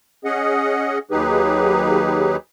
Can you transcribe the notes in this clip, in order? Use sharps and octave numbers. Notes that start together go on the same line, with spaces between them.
C#4 G#4 D#5 F#5
D#2 F#3 D#4 G4 G#4 B4